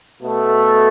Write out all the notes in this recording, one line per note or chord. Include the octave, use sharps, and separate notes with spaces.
B2 A3